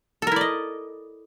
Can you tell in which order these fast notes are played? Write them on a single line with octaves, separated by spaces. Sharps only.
A4 A#4 E4 D5 D#5